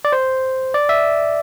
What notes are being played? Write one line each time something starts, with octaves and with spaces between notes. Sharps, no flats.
D5
C5
D5
E5